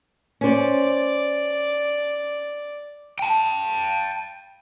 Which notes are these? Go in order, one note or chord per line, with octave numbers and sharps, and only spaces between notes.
C#4 C5 D5
G5 A5